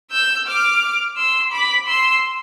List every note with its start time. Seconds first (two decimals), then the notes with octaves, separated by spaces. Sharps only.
0.12 E6 G6
0.47 D6 F6
1.17 C6 E6
1.52 B5 D6
1.87 C6 E6